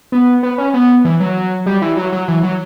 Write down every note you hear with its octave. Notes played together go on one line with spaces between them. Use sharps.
B3
B3
C#4
B3
E3
F#3
G3
E3
F#3
F#3
E3
F#3